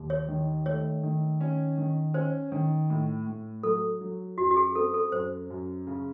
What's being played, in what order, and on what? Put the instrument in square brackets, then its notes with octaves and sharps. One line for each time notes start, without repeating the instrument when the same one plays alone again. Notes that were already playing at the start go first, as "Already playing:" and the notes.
Already playing: [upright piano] D#2
[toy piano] C#5
[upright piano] D#3
[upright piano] A3 [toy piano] C#5
[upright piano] D#3
C#4
D#3
[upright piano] C#4 [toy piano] C5
[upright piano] D#3
A2
A2
[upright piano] F#3 [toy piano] A4
[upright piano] F#3
[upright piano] F#2 [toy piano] F#4
[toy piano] F#4
G#4
[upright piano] C4 [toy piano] A4
[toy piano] A4
[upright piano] F#2 [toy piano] C5
[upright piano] F#2
C#3